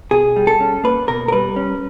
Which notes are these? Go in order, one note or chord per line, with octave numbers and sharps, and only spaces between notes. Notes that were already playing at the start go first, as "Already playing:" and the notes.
B2 G#4
G3
A4
C#4
A#3 B4
B2 A#4
A#4
G3 B4
C#4